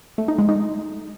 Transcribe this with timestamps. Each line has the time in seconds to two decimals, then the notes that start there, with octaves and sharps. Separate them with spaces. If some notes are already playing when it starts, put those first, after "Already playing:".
0.18 A3
0.28 D#4
0.39 G#3
0.49 D#4